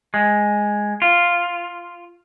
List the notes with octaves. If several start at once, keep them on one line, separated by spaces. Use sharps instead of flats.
G#3
F4